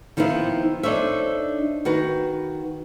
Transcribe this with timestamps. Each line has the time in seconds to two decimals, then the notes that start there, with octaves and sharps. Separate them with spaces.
0.17 D#3 F3 B3 D#4 E4 C5
0.83 D4 D#4 A4 C5 C#5 E5
1.85 D#3 F#4 B4